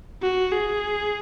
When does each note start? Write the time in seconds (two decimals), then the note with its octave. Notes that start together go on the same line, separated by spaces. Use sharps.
0.22 F#4
0.52 G#4